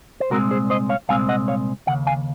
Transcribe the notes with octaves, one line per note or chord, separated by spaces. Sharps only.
C5
C2 A#2 G#3 C4 F#4 A#4
G#4 C5
C5 D#5
C#5 F5
C2 A#2 G#3 C4 F5 G#5
D#5 F#5
C#5 F5
D#2 C#3 F#5
F5 G#5